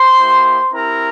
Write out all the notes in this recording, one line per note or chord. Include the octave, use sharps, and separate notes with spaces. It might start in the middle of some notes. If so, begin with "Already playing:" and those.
Already playing: C5 C6
A#3 E4 G4
C4 E4 G4 A#4 A#5